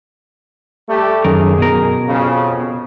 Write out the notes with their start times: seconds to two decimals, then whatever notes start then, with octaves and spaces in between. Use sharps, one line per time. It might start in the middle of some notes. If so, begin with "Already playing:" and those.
0.88 G3 A3 G4
1.25 F#2 D#3 G#4 A#4
1.58 B2 A#4
2.08 F2 C#3